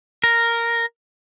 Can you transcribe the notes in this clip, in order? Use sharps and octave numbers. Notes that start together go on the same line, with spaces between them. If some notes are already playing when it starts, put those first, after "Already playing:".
A#4